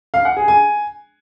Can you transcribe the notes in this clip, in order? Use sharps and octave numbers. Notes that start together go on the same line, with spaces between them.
F5
F#5
G#4
G#5